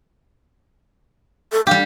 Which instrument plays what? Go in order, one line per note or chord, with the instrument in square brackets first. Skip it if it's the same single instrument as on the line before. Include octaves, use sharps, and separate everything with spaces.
[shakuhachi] A4
[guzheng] G3 G4 [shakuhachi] F5